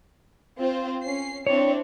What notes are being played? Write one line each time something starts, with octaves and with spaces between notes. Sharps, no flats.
C4 F4 C5
C#4 C7
C4 D4 E4 C#5